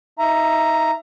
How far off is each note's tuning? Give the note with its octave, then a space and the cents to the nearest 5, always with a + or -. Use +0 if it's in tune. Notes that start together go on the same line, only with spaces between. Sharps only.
D#4 +25 E5 +25 A#5 +0